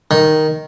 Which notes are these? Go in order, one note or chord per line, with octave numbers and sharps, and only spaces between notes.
D#3